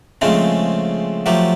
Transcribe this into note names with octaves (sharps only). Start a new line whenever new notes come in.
C#3 F3 G#3 A3 C4
F3 F#3 A3 G4